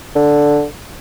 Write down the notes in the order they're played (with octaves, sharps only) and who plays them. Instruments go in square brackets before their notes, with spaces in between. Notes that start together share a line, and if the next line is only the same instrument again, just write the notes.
[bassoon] D3